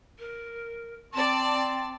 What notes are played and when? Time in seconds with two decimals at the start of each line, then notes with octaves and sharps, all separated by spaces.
0.19 A#4
1.14 C4 D5 A5 C6